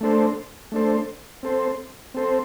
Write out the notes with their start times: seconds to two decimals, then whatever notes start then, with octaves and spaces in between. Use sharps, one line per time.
0.01 A3 D4 A4 C5
0.72 A3 D4 A4 C5
1.43 C4 A4 C5
2.14 C4 A4 C5